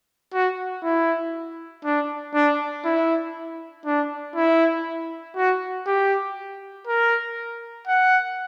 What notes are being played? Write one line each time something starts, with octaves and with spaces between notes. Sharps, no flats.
F#4
E4
D4
D4
E4
D4
E4
F#4
G4
A#4
F#5